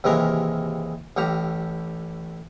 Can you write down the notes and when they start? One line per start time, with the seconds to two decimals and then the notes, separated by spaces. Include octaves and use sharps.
0.04 D#2 C3 E3 G#3 A#4 F5
1.17 A1 A2 G4 F5 A#5